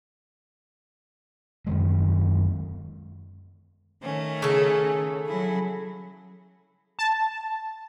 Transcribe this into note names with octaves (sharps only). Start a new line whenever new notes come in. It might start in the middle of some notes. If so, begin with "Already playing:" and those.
F#2 D#3 G#3
D#3 A3 C#4
C#3 A4
F#3 E4 G#4
A5